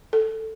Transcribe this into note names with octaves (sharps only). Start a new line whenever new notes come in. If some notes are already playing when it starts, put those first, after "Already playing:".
A4